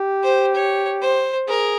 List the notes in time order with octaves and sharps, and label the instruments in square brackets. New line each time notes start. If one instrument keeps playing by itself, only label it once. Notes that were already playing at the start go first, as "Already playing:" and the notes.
Already playing: [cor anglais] G4
[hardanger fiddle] C5
C#5
C5
[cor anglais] G#4 [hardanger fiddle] A#4